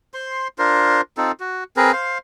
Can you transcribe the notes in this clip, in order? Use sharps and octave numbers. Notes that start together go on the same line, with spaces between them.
C5 C6
D4 F4 A#4 C5
C4 D#4 F4 A4
F#4
C4 G#4 A#4 B4
C5 F5